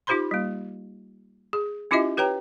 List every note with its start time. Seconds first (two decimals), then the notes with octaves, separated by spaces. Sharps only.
0.07 D#4 F4 G4 C5 B5 C6
0.31 G3 A#3
1.53 G#4
1.91 C#4 E4 F4 G4 D#5 E5
2.17 G4 B4 C#5 G5 A#5